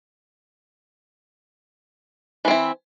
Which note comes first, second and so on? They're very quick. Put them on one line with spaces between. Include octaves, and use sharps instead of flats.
E3 C4 E4